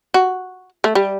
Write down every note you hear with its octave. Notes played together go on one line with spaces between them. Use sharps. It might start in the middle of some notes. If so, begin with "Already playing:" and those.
F#4
A3
G3